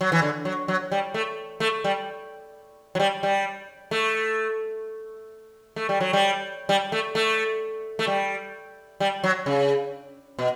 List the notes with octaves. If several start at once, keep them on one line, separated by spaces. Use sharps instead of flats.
F#3
E3
D3
F#3
F#3
G3
A3
A3
G3
F#3
G3
G3
A3
A3
G3
F#3
G3
G3
A3
A3
A3
G3
G3
F#3
C#3
B2